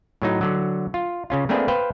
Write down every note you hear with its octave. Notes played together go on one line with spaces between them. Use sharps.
A2 F#3 D#4
D3 F#3
F4
C#3 C#4 F4
A3 A#3 C4 D4 G#4 B4
B4 C5 F5 G5